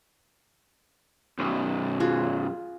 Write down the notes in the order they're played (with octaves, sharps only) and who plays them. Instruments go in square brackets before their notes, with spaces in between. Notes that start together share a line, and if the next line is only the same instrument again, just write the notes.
[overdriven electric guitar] B1 F#2
[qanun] F4 F#4 G#4